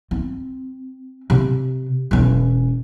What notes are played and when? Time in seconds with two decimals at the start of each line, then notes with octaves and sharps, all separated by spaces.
0.11 C4
1.30 C3
2.11 E1 C#4